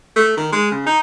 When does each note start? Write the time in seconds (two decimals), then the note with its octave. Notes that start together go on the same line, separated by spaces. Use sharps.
0.16 A3
0.37 D#3
0.52 G#3
0.71 C#3
0.87 D#4